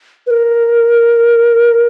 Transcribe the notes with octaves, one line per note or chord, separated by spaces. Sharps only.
B4
A#4